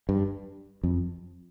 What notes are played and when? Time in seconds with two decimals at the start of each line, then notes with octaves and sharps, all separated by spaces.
0.09 G2
0.84 F2